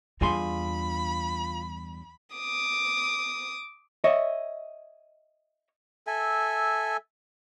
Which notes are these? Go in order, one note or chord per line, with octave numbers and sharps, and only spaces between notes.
E2 G2 F4 G#4 F5 B5 C6
D6 D#6
C#5 D#5 E5
A4 E5 G#5